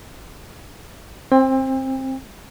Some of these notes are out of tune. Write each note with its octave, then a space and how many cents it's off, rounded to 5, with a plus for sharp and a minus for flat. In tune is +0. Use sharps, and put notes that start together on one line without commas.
C4 +15 G5 +40